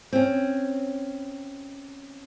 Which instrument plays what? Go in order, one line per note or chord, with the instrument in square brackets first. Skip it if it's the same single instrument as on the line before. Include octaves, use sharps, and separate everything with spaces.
[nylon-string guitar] C4 C#4